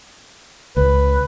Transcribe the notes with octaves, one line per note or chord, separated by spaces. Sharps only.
C#2 B4